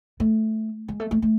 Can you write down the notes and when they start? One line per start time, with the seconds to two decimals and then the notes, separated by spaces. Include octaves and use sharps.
0.20 A3
0.88 G#3
1.00 A3
1.11 A3
1.22 A3